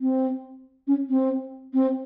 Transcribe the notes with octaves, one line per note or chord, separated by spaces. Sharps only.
C4
C#4
C4
C4